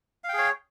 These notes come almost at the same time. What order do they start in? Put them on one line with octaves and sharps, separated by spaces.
F5 G5 G#4 C#5